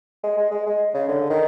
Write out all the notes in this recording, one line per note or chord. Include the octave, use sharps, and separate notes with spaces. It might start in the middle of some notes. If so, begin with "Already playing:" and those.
G#3
G#3
G#3
G#3
C#3
D3
D#3